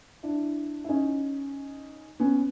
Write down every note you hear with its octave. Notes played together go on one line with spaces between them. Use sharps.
D4 E4
E4
C#4 D#4
B3 C#4